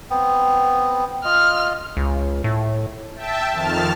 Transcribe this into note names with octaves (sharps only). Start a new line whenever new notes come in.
B3 C4
F4 D#5 F6
C#2
A2
E5 G5 A5
F2 D#3 A5 F6